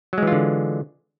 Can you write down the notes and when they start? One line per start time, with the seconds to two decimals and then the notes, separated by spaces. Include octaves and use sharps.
0.13 F#3
0.18 G#3
0.23 E3
0.27 F4
0.32 D3